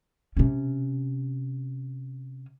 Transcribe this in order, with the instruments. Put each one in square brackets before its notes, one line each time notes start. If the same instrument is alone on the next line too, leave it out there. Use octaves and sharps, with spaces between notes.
[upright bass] C3 C#4